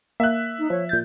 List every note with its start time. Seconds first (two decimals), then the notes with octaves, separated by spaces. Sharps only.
0.20 A#3 E5 F#6
0.58 D#4
0.70 F3 C#5
0.89 A#2 G6 A6